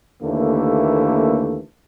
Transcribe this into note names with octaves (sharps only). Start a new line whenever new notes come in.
D#2 D3 E3 A3 A#3